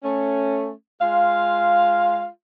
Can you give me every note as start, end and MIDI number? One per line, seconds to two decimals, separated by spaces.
0.04 0.72 57
0.04 0.72 61
1.01 2.28 56
1.01 2.28 65
1.01 2.28 77